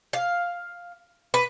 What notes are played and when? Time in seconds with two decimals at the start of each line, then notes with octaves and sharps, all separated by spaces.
0.13 F5
1.34 B4